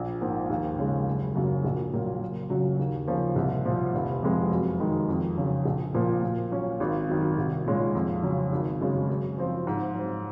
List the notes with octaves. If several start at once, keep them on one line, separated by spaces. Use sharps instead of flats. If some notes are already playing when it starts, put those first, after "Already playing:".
Already playing: A#1
G#2 F3 A#3
D#2
C#3 G#3
F#1
F#2 C#3 F#3 A#3
A#1
A#2 F#3 A#3 F4
F#1
F#2 C#3 F#3
D#2
C#3 F3 A#3 C#4
C2
A#2 F3
F1
F2 C3 F3 G#3
F#2
D#3 G#3 D#4
F2
C#3 F#3
A#1
A#2 F3 A#3
A#2
F#3 C#4
G#1
F#2 D#3
C2
A#2 G#3 C#4
F2
C#3 F#3 C#4
G#1
F#2 C#3 G#3
F#2
F3 C4 F4
G#2
F#3 C4